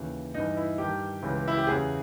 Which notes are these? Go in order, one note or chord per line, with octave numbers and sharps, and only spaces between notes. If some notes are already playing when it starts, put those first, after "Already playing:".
Already playing: D#2 C#3 E3
G2 E3 D#4
E4
G2 D#3 G4
C#2 C#3 E3
E4
G4
E2 C#3 E3 G#4